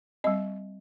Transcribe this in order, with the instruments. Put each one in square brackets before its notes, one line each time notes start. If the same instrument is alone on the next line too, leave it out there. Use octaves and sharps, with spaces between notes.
[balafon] G3 C4 D#5